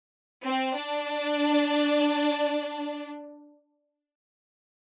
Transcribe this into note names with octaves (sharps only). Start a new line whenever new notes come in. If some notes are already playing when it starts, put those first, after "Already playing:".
C4
D4